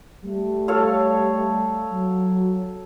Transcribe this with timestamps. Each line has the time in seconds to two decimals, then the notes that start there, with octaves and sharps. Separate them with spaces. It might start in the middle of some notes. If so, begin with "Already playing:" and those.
0.24 G3 A3
0.68 A4 C#5 F5
1.91 F#3